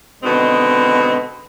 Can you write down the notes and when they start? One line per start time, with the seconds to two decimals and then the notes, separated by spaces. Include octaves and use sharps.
0.23 B2 D3 D#3 G#3 C4